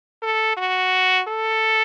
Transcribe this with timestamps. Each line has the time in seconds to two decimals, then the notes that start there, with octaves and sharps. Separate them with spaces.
0.23 A4
0.57 F#4
1.28 A4